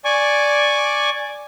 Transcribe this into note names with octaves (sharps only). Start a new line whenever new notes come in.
D5 G#5 C#6 D6